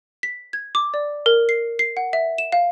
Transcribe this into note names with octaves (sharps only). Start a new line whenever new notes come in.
B6
G#6
D6
D5
A#4
C7
C7
F#5
E5
E7
F5